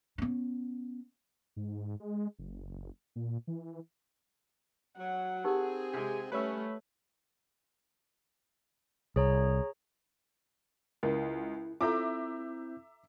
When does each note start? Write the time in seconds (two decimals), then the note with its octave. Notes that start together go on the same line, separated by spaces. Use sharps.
0.18 B3 C#4
1.56 G#2
2.00 G#3
2.38 F#1
3.16 A#2
3.47 E3
4.97 F#3 F#5
5.44 C4 D#4 G4 G#4 A#4
5.94 C3 G#3 G#5
6.32 G3 A3 C#4 B4 C#5 E5
9.16 C2 G#4 C#5 A#5
11.03 C#2 E4 A#4
11.81 C4 E4 F4 A4 E5 A#5 D6 G6